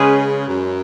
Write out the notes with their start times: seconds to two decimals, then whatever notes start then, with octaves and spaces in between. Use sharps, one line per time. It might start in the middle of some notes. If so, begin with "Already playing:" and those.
Already playing: C#3 G#3 C#4 G#4 B4
0.47 F#2